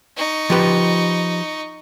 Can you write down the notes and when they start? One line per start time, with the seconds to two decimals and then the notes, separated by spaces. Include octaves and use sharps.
0.16 D#4 C#6
0.50 F3 G4 B4